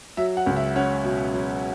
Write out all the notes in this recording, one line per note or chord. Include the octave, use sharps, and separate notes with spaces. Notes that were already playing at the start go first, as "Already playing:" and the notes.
F#3 E5
F#5
C#2
E5
C#4 F#5
B2
F#3